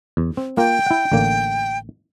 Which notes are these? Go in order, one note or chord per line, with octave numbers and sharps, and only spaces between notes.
E2
C4
A#3 F4 A#4 G5
E4 F#5
A1 D3 A#3